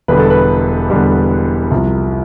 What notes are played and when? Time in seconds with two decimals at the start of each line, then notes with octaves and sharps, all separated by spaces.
0.08 E1 E2 D3 G3 B4
0.19 A4
0.30 B4
0.90 E1 E2 D3 G3
1.71 C2 C3 F3